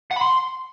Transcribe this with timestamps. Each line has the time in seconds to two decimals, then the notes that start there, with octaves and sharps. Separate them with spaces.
0.11 F#5
0.16 B5
0.22 C6